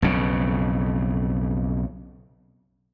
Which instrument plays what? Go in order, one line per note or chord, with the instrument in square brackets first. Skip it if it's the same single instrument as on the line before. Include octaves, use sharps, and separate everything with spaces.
[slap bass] B1 F2 C#3